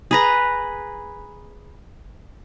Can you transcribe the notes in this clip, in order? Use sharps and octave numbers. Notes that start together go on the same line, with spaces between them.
G#4 B4 A#5